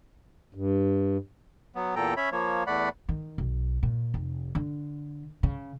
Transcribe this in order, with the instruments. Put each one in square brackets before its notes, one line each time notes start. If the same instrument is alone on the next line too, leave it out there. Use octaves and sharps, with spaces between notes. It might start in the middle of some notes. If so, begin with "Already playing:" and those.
[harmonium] G2
[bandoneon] F#3 B3
E2 A#2 A4 G5 A#5
C#4 C#5 E5 B5
F3 A#3 C#5
E2 A3 D5 F#5 B5
[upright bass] D#3
B1
A#2
F1
D3
C#3